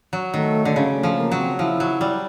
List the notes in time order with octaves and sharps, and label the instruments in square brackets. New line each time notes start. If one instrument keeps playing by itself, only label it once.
[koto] F#3
[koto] D#3 [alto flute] A3
[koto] D3 [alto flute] A3
[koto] C#3 [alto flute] G#3
[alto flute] A3
[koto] F3
[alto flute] A#3
[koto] F#3
[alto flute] C4
[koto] F3 [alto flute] E4
[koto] F#3
G3